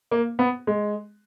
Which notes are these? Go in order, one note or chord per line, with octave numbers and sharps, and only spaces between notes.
A#3
B3
G#3